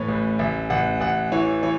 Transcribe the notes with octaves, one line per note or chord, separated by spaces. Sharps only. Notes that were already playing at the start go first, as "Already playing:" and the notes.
Already playing: A2 E3 B4 C#5
A1
A1 E5
A1 F#5
A1 F#5
E3 C#5
E3 C#5